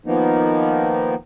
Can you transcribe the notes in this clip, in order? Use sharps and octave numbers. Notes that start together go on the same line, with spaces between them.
D#3 F3 A#3 B3 D#4